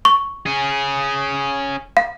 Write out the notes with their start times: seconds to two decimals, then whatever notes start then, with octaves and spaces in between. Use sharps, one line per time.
0.05 C#6
0.46 C#4 G#4
1.97 F5